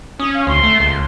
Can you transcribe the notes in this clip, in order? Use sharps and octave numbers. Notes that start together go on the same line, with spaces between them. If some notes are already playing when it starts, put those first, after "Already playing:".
C#4 D#6
F5
D2 C6
A3
C#2